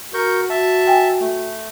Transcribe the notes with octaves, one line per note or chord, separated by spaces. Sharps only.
F#4 A#4 C#6 G6
E5 A5
G5 G#5
A3